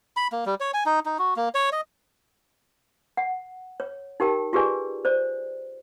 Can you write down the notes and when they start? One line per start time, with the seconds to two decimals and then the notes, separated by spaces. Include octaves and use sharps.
0.17 B5
0.32 A#3
0.46 G3
0.60 C#5
0.74 G#5
0.86 D#4
1.06 D#4
1.19 F#4
1.36 A#3
1.55 C#5
1.72 D#5
3.17 F#5
3.80 C#5
4.20 D#4 G4 A#4 G5 A5
4.53 F4 G4 G#4 B4 D5 G#5
5.05 C5 D5